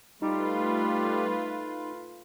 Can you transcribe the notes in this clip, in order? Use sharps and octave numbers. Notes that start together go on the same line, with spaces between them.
G3 A3 D#4 F4 B4